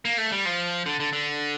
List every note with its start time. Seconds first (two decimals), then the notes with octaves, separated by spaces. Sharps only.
0.05 A#3
0.18 A3
0.32 G3
0.45 F3
0.86 D3
1.00 D3
1.13 D3